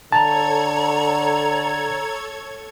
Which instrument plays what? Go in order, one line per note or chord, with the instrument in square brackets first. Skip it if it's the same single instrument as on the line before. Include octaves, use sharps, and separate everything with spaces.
[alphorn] D3 [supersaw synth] A4 C#5 G#6 [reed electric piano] A5 [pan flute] A#5